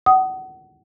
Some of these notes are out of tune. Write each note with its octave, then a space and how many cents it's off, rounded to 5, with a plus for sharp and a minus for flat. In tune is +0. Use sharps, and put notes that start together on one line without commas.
F#5 +30 D#6 +0